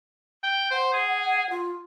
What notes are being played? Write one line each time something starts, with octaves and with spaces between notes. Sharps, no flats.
G5
C5 F#5
G#4
F4